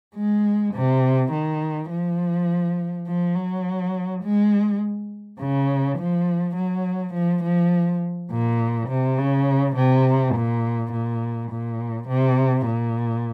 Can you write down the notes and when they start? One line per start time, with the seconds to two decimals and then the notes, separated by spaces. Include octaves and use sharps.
0.15 G#3
0.74 C3
1.32 D#3
1.90 F3
3.07 F3
3.35 F#3
4.23 G#3
5.39 C#3
5.98 F3
6.56 F#3
7.13 F3
7.43 F3
8.30 A#2
8.89 C3
9.18 C#3
9.76 C3
10.34 A#2
10.92 A#2
11.51 A#2
12.08 C3
12.66 A#2